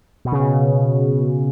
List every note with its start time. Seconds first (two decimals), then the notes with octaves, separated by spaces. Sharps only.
0.25 B2
0.32 C#3
0.40 B2